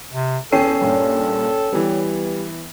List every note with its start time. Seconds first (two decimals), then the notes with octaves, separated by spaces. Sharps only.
0.11 C3
0.52 E2 C#4 A4 C#5 G5 C7 D#7
0.81 G2 A#2
1.72 E3 G3 B3